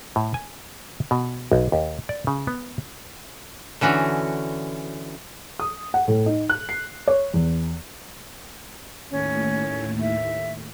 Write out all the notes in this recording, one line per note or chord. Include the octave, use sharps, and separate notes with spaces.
A2
G#5
B2
B1
D#2
D5
C#3
B3
D3 E3 C#4 F#4
D#6
F#5
A2
D#4
F#6
C7
C#5
E2
D#2 A2 C#4
E5